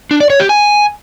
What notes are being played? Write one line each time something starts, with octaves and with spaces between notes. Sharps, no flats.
D4
D5
C#5
G4
G#5